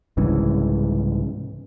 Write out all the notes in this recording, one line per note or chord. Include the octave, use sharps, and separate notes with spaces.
C2 G#2 C#3 E3